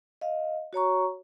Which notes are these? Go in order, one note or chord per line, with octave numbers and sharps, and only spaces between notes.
D#5 F5
F#4 C#5 A#5 C#6